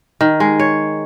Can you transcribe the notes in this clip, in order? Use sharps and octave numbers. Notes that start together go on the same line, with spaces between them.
D#3
G#3
C#5